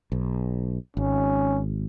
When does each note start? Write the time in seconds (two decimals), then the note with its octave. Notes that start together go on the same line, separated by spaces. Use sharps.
0.12 B1
0.97 G#1 C#4